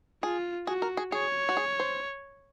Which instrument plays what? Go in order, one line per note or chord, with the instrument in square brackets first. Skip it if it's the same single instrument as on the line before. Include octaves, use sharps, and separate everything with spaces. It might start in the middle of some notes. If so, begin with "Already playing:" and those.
[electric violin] F4 [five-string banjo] G#4
[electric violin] F#4 [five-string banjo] G#4
[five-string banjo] A#4
G#4
[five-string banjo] G#4 [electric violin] C#5
[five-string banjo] F#4
G#4
C5